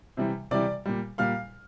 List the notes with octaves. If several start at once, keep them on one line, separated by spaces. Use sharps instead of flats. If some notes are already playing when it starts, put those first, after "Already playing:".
C3 E3 G3
C3 E3 G3 D5 D6
A#2 G3
A#2 G3 F5 F6